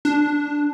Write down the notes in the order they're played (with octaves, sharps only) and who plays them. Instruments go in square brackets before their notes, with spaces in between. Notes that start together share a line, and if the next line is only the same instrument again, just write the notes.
[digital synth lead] D4